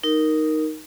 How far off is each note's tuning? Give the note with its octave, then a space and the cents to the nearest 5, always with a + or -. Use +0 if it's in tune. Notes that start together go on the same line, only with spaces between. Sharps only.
D#4 +0 A#4 +0